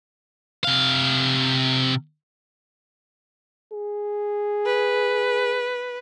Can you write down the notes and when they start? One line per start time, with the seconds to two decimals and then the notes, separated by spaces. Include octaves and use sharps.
0.64 C3 F5
3.72 G#4
4.66 B4